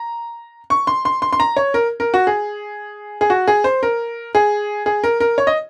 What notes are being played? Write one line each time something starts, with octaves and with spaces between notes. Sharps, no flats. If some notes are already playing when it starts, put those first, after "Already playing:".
Already playing: A#5
C#6
C6
C6
C6
C6
A#5
C#5
A#4
A#4
F#4
G#4
G#4
F#4
G#4
C5
A#4
G#4
G#4
A#4
A#4
C#5
D#5